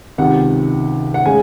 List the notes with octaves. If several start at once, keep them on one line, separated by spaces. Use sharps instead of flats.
C#2 C3 D#3 F#5
F#5
C#3 G#3 G#5